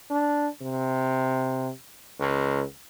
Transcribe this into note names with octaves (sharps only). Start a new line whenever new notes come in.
D4
C3
C#2